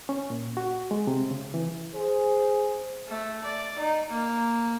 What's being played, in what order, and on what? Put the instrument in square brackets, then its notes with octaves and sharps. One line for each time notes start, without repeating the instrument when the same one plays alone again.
[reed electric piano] C#4
A#2
F#4
G#3
C3
C#3
E3
[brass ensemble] G#4 C5
[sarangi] A3
D5
D#4
A#3